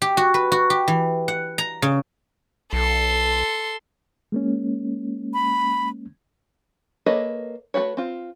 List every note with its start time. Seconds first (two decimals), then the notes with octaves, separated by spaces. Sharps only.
0.02 G4
0.17 F#4
0.34 B4
0.52 F#4
0.70 G4
0.88 E3
1.28 F#5
1.58 A#5
1.82 C#3
2.73 B1 A4 C6
4.32 G#3 A#3 C#4
5.34 B5
7.06 A#3 A4 B4 C#5 D#5
7.74 A3 C4 F#4 B4 C#5
7.97 C4 F4